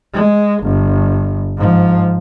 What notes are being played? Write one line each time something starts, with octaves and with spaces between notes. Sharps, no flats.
G#3
G1
G#2 F3